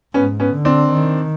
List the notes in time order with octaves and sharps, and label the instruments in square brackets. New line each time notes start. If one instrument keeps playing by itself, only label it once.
[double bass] G#2 [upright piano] B3 C#4
[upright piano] B3 C#4
[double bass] D3
[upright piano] C4 D4
[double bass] D#3